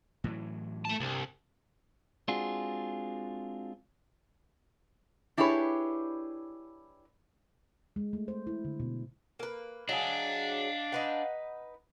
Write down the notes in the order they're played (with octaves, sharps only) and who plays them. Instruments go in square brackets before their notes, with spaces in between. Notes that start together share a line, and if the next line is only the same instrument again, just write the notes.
[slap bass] A2 E3 F#3
[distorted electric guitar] A3 A5
[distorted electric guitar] C2 [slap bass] G2
[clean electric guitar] G#3 C4 D4 F4 F#4 G#4
[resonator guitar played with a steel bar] D4 E4 G4 G#4 B4 C#5
[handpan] G#3
A3
C5
E4
D3
B2
[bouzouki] A#3 B4
[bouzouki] F#3 G#4 [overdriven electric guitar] D4 [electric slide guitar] D#5 F5
[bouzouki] D#4 B4 F#5